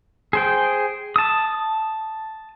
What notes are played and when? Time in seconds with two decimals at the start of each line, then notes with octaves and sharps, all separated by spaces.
0.33 G#4 C5 G5
1.16 A5 D#6